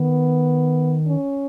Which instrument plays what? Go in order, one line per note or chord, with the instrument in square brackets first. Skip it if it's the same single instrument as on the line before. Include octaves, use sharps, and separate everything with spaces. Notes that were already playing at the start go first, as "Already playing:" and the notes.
Already playing: [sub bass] D#3 [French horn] B3
[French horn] C#4